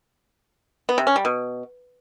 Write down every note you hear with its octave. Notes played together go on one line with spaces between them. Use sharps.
B3
C3
C#4
G3
B2